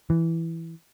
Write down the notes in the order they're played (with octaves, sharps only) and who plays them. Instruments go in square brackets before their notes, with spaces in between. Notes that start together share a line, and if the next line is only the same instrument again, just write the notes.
[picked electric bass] E3